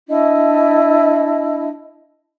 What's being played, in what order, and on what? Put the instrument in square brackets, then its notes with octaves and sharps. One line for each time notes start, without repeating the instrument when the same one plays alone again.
[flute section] D4 E4 D#5